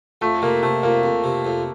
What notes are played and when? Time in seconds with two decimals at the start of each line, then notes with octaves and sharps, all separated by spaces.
0.21 F2 A3
0.42 C3 A#3
0.63 C3 A3
0.83 F2 A#3
1.03 F2
1.24 C3
1.45 F2